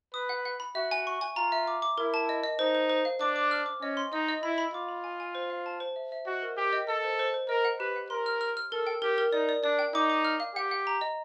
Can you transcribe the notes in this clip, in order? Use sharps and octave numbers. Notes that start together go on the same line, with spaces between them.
B4 D#6
F#5
F#5
B5
F#4 E5
G#5
C#6
G#5
F4 A#5
E5
D6
D6
E4 A#4
A5
D#5
D#5
D#4 C5
C5
C5
F5
D4 D6
D6
F6
D6
C#4 D#5
C6
D#4 D#5
D#5
E4 B5
B5
F4 D6
B5
G#5
G#5
C5
F5
A5
C5
E5
E5
F#4 D#5
A#4
G4 A#4
D#5
A4 D#5
C5
C5
C5
A#4 D#5
F#5
G4 B4
F#5
A#4 C6
F6
F6
F6
A4 A#4
G5
G4 A#4
A#4
D#4 D5
D5
D4 D5
G5
D#4 D6
D6
F6
F5
G4 F#5
F#5
A#5
D#5